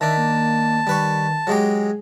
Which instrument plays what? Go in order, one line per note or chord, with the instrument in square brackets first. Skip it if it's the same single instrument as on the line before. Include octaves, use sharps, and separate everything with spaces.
[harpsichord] D#3 D4 [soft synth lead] E5 [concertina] A5
[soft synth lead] A#3
[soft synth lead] D#3 [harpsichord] G3 B4 C#6
[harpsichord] F#3 G#3 G4 [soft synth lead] G#4